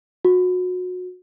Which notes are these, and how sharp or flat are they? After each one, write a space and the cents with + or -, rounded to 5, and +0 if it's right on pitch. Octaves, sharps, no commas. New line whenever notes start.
F#4 -25